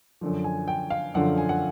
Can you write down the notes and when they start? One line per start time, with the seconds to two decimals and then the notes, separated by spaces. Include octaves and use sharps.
0.21 F#2 D3 F3
0.44 G#5
0.68 G5
0.90 F5
1.15 F#2 D3 F3 F#5
1.38 G#5
1.49 F#5